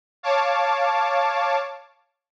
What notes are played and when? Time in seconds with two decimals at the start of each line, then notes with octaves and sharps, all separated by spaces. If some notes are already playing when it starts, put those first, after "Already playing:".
0.23 C#5 F5 A5 D6